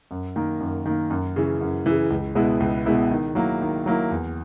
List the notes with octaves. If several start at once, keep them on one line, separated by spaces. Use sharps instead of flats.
F#2
D#3 A#3
F#2
D#3 A#3
F#2
C#3 E3
F#2
C#3 E3
C#2
B2 G#3 B3 E4
C#2
B2 G#3 B3 E4
D#3
F#3 A#3 E4
D#3
F#3 A#3 E4
E2